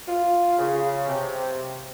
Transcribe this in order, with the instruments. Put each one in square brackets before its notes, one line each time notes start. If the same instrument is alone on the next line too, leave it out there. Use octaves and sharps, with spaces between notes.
[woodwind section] F4
C#3
C3